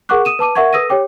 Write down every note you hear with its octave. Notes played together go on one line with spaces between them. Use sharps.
G#4 A#4 F#5 C#6 D6 F#6
D#6 D#7 E7
B4 A5 D6 D#7
A#4 E5 F#5 C#6 G#6
A4 B4 D#6 E6 A#6 D#7
G4 C#5 G5 D6